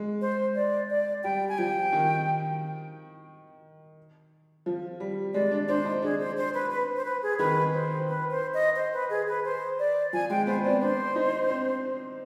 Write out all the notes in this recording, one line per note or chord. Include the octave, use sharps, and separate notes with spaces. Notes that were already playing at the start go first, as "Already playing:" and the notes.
Already playing: G#3
C5
D5
D5
G3 G5
G#5
F3 G5
D#3
F3
G3
G#3 D5
D4
D4 C5
D#4
D4 G#4
C5
C5
B4
B4
C5
B4
G#4
D#3 B4
C5
B4
C5
D#5
C5
B4
G#4
B4
C5
D5
F3 G#5
G#3 G5
B3 C5
C4 D5
D4 C5
D#4
C4